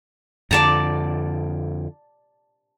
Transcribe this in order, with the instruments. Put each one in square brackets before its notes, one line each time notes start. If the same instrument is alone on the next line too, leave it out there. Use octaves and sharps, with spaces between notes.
[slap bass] F2 D3 [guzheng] D5 A5 A#5